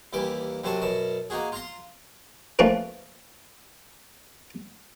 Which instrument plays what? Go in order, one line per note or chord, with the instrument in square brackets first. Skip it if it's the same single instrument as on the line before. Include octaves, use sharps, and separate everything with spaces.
[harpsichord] D#2 E3 G3 D6
F#2 C3 C4 F#4 A5
F#2 B2 A5
A#3 D#4 F#4 G#4
F4 A#5 C6
F3 A3 A#3 C4 C#4 B4